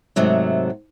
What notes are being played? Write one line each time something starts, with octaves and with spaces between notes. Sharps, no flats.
G#2 C3 F#3 A3